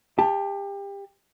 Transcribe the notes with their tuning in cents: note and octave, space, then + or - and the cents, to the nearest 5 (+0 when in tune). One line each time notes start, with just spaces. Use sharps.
G4 +25 A5 +0